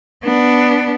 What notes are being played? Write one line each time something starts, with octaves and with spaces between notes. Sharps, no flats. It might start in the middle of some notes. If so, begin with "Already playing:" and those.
B3 D4